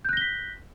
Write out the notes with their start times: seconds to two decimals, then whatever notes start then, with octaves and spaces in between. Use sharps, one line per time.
0.05 G6
0.09 F#6
0.13 A#6
0.17 G7
0.21 B6